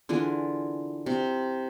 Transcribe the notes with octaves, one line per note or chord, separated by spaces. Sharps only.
D3 E3 F4 G#4
C3